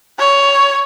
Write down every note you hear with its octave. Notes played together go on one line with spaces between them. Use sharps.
C#5